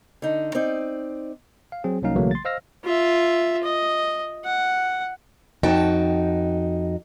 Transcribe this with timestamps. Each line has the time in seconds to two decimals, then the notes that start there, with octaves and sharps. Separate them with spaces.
0.22 D3 D#4
0.55 C4 D#4 D5
1.72 F5
1.84 F#3 C4 G#4
2.02 C2 F#3 A#3 C#4 D#4 F5
2.16 B1 C#3 E3 F#3 A3 A#3
2.31 C6 A6
2.45 C5 D#5 F5 E6 F6 A#6
2.84 F4 E5
3.64 D#5
4.45 F#5
5.63 F2 D#4 F#4 G5 A5